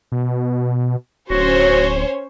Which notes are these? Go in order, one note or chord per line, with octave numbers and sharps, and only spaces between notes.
B2
D1 C#4 F#4 C5 C#5